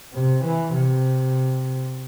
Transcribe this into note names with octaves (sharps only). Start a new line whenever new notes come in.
C3
E3
C3